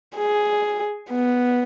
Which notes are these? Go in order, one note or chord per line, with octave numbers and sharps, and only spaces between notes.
G#4
B3